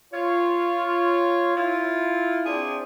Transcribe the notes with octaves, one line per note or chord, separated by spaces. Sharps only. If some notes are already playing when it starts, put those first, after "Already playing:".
F4 C#5
E4 F4
C4 D4 E4 G#4 C5 D5